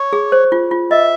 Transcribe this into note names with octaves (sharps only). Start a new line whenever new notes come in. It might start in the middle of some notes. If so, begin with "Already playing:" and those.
Already playing: C#5
G#4
C5
F4
F4
D#5 E5